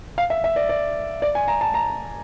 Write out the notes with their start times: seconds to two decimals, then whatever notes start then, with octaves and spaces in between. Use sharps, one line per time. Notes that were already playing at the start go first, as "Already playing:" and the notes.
0.18 F5
0.30 E5
0.44 E5
0.56 D5
0.69 D5
1.22 D5
1.35 G#5
1.48 A#5
1.61 A5
1.74 A#5